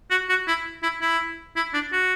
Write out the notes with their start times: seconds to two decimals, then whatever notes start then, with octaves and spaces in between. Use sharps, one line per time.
0.11 F#4
0.29 F#4
0.48 E4
0.83 E4
1.01 E4
1.56 E4
1.74 D4
1.92 F#4